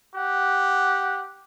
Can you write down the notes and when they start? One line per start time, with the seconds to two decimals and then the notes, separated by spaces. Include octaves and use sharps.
0.15 G4 F#5